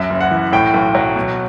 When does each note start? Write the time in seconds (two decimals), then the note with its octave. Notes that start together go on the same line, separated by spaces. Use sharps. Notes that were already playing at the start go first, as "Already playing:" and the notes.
Already playing: F#2 E5
0.10 F#1
0.21 F#5
0.31 E3
0.52 A2 G5
0.74 B1
0.95 F#3
1.16 B2